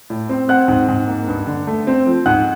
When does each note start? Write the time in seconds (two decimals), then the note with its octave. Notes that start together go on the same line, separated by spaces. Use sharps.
0.10 A2
0.29 C4
0.48 C4 F#5 F#6
0.68 G#2
0.88 G#2
1.08 A#3
1.27 G2
1.47 D3
1.67 A3
1.87 C4
2.07 F3
2.26 G#2 F#5 F#6